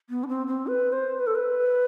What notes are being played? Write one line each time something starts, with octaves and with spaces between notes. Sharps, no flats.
B3
D4
C4
C4
B4
C5
B4
A4
B4